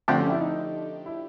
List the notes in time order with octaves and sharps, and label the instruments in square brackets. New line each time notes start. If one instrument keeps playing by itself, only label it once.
[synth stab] D3 F3 A3 D4 G4 [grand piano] C4
[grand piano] C#4
E4
D#4
E4